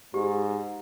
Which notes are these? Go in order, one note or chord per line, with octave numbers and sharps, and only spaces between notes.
G#2 G4